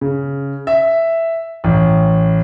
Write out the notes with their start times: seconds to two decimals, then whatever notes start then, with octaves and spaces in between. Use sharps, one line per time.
0.01 C#3
0.67 E5
1.64 A1